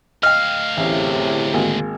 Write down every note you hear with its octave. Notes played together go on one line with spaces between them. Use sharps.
D2 D#5 F5 G5 F6
A1 E2 A2 C3
G#1 G#3 A#3